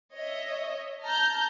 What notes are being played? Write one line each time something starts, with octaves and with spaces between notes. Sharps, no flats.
C#5 D#5 E5
A5 A#5 F6 G6